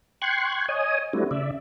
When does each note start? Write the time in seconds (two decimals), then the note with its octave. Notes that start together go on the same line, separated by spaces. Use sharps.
0.22 G5 C6 C#6 F#6 G#6
0.68 C#5 D#5 G#5 D#6
1.13 G3 A3 C4 D4 E4 F#4
1.31 C#3 D5 E5